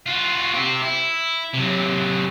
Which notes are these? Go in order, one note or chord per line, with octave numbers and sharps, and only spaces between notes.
F4 F#4
C4 G4
E4
C3 F#3